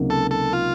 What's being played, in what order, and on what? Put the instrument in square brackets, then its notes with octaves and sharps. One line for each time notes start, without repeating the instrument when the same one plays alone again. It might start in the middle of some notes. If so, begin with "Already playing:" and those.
Already playing: [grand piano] C#2 C3 F#3 A#3 D#4
[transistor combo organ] A4
A4
F4